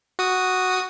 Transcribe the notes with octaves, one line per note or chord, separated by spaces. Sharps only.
F#4 D#6